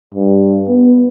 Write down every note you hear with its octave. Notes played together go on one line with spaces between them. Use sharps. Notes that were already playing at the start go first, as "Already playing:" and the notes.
G2
B3